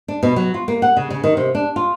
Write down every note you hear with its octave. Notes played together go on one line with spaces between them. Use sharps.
D4
B2
F#3
F4
A#3
F#5
C#3
C#3
D#3
C3
D4
F4